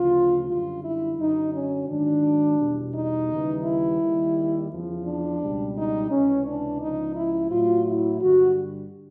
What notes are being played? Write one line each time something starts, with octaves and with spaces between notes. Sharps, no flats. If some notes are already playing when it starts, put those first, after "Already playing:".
Already playing: D2 C#3 F3 F4
F#2 D3 G3 F4
E4
F#2 D3 F#3 D#4
C#4
G#2 D#3 F#3 D4
E2 B2 G3
D#4
D#2 C#3 E3 G3
E4
D#2 D#3 G3
E2 C#3 F3
D4
C#2 B2 G3
D#4
C#2 C3 E3 C#4
D4
C#2 C#3 F3 D#4
E4
A2 F#3 F4
E4
G2 D3 G3 F#4